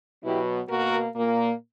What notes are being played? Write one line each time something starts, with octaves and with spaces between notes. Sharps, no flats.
B2 F#3 B3 E4 G4
B2 A#3 F#4 A#4
A#2 A#3